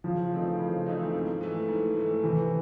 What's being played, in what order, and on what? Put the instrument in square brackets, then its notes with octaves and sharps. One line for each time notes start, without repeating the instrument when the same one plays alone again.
[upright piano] C#3 [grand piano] F3
[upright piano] E3 A3 C4 D#4
C#3
E3 A3 C4 D#4
G#2
E3 A3
G#2
E3 A3
[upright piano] C3 [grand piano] E3